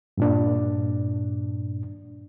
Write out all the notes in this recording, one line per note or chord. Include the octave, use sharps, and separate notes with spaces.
G2 A#2 D4